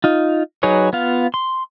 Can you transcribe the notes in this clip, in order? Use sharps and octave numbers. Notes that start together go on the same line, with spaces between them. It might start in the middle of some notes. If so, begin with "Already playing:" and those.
D#4 F4
F#3 D#4 G#4 B4 C#5
B3 F4 F5
C6